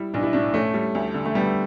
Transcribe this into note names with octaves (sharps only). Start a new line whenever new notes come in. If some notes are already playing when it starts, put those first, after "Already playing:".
Already playing: G3 E4
B1 D4
E4
A2 D4
A3 C#4
G3
D2
D3
A3
G3 B3